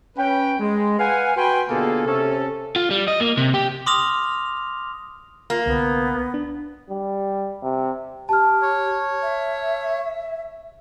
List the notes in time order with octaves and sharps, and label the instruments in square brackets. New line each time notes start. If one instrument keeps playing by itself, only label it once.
[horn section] C#4 B4 G5
G#3
B4 F5 F#5 G#5
F#4 B4 G5 G#5 B5 C6
B2 D3 A#3 F4 G#4 A4
C3 C#4 A4
[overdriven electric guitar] F4
G3
D#5
A#3
C3
G4
[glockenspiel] C6 D6 D#6 F6 A#6 F7
[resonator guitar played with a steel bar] A#3 [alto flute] F4
[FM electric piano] C2 D3 [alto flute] B3
[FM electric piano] D4
[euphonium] G3
C3
[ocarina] G4 [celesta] A5 F6
[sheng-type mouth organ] C#5
[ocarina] E5